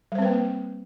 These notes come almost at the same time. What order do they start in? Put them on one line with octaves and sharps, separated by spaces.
G3 C5 C4 B4 A#3